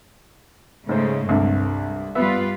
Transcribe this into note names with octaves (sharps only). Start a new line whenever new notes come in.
G#2 C#3 G#3 A3 C5
C2 G2 D3
G3 B3 F4 B4 E5